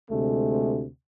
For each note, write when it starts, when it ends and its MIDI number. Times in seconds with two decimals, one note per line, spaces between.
0.11 0.85 38
0.11 0.85 48
0.11 0.85 56
0.11 0.85 57